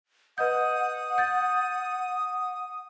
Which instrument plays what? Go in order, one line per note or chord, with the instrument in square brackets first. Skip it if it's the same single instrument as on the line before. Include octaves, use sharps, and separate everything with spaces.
[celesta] B4 D#5 G6 [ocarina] F#5 [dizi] D#6
[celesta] G6 A6